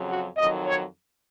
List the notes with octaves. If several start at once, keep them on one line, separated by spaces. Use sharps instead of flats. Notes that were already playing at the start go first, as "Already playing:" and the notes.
Already playing: F2 C#3 F#3
F#4
F2 D#3 F#3 D#5
C#5